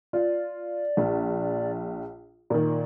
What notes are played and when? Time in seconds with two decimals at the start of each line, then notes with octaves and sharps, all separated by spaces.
0.13 F4 D5
0.97 A#1
2.50 A#2 D#3 A#4